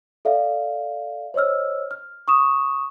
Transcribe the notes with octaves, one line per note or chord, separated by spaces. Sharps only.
A4 D5 E5 F5
C5 C#5 D#5 E6 F6
F6
C#6 D#6 E7